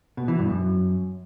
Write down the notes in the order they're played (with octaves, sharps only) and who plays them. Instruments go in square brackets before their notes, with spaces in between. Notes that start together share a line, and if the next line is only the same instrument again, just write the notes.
[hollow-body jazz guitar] B2
E3
G2
F#2